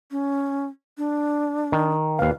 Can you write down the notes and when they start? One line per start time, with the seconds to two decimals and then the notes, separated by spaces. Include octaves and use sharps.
0.11 C#4
0.98 D4
1.72 D#3
2.19 D#2 B4 F5